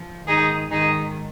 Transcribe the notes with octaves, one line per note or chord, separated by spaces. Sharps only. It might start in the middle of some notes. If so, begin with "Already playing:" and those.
Already playing: F3
G#2 D#3 D#4 G#4
G#2 D#3 D#4 G#4